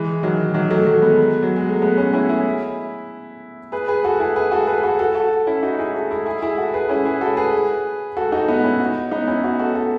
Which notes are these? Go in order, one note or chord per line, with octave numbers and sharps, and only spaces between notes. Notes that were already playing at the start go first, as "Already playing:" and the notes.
Already playing: E3 G#3
D#3 F#3
D#3 F#3
F#3 A3
F#3 A3
G#3 B3
F#3
G#3
A3
G#3 B3
A3 C#4
C#4 E4
E4 G#4
G#4 B4
G#4 B4
F#4 A4
E4 G#4
G#4 B4
F#4 A4
G#4 B4
F#4 A4
F#4 A4
F#4 A4
C#4 E4
D#4 F#4
E4 G#4
F#4 A4
E4 G#4
E4 G#4
E4 G#4
F#4 A4
G#4 B4
C#4 E4
E4 G#4
F#4 A4
G#4 B4
F#4 A4
D#4 F#4
B3 D#4
C#4 E4
D#4 F#4
B3 D#4
C#4 E4
D#4 F#4
F#4 A4
F#4 A4